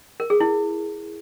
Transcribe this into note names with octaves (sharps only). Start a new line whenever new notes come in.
A#4
G#4
E4